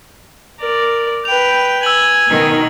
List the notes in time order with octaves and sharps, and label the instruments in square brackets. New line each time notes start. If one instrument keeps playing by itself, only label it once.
[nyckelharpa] A#4 D5
[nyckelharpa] B4 G5 [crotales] F7
[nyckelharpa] G#5 [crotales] E6 G#6 F#7
[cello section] B2 D#3 D#4